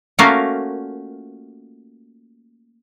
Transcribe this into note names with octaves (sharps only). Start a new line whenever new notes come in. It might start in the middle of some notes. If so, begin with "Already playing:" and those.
A3 A#3 C#4 F4 F#4 A#4